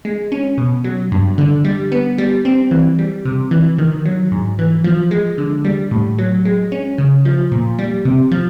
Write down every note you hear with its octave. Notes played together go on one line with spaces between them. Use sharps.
G#3
C#4
B2
F#3
G2
D3
G3
B3
G3
C4
E3
G3
C3
E3
D#3
F#3
G#2
E3
F3
G#3
D3
G3
A2
F#3
G#3
C#4
C#3
F3
A#2
G3
C3
F3